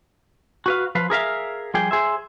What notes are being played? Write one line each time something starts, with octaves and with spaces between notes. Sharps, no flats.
F#4 B4 F5
F3 B4 F5
G#4 A#4 E5 F5
F3 G3 G#4 G5
G#4 C5 E5